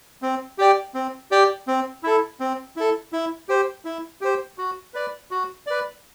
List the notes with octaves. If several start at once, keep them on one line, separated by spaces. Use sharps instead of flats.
C4
G4 D5 G5
C4
G4 D5 G5
C4
E4 A4
C4
E4 A4
E4
G4 C5
E4
G4 C5
F#4
B4 D5
F#4
B4 D5